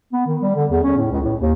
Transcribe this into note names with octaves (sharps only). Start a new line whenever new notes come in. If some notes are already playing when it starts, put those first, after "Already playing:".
B3
D#3
G3
D3
E2
C#4
A2
C#2
A2
D#2